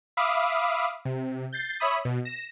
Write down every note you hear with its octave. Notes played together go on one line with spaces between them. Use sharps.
E5 F5 B5 D6 D#6
C3
G6 A6 C7
C#5 E5 B5 D#6
B2
A#6 E7